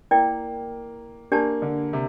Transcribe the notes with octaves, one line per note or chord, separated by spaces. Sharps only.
A#3 E4 A#4 D5 G5
A#3 D4 G4 A#4 D5 A5
D3
C3